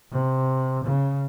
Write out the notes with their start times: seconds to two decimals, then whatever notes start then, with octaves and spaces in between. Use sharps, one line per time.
0.12 C3
0.84 C#3